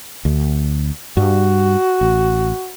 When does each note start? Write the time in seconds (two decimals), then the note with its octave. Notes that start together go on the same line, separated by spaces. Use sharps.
0.25 D2
1.17 G2 G3 F#4
2.01 A1